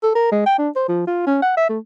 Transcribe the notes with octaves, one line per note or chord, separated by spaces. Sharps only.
A4
A#4
G#3
G5
D4
C5
F3
F4
C#4
F#5
E5
A3